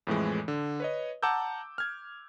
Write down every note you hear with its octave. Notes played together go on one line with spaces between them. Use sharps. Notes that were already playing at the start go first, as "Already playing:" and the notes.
F2 A2 E3 G#3
D3
B4 C#5 D#5
F#5 A5 A#5 D6 E6 G6
F6 G#6